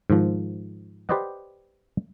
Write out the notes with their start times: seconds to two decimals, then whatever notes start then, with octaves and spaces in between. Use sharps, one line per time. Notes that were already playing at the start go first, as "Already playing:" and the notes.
0.10 G#2 D#3 F3
1.09 G4 B4 C5 D5 D#5 F#5